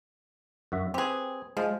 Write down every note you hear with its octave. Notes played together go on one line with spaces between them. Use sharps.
F#2 F#4 E5
C4 G4 G#4 B4
F3 G#3